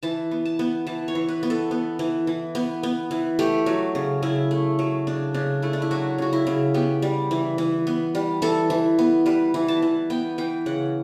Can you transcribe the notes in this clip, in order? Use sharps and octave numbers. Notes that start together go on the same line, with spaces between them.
E3 A5
B3
A5
B3
E3 A5
C#5
E3
B4
B3
A4
B3
E3
E3
B3
B3
E3
A3 G4
F#3
C#3
C#3 E4
A3
F#3
C#3 D4
C#3 D4
A3 E4
D4
E4
F#3 F#4
C#3 F#4
E4
C#3
B3 G4
G3
E3
E3
B3
G3
E3 A4
E3
B3
G3 B4
E3
A5
E3
B3 G5
E3 G5
C#3 F#5